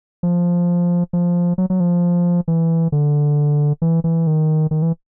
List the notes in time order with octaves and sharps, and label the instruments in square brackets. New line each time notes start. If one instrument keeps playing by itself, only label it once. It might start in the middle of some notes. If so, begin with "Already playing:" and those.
[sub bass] F3
F3
F#3
F#3
F3
E3
D3
E3
E3
D#3
D#3
E3